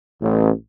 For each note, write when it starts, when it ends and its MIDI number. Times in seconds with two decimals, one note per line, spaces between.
0.21 0.50 33